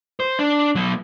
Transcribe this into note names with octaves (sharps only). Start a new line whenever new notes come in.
C5
D4
F#3 B3